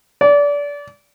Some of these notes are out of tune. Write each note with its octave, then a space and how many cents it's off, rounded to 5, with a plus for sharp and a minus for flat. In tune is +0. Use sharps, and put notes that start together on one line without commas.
D5 -25